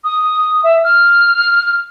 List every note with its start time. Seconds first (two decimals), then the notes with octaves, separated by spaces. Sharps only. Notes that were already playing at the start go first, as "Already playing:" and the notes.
0.04 D#6
0.64 E5
0.84 F6